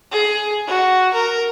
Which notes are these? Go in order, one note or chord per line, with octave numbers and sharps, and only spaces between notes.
G#4
F#4
A#4